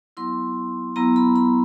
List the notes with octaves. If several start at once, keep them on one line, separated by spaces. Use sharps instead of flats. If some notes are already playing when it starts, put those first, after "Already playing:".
F#3 B3 E4 C6
F#3 B3 E4 A#5
B5
B5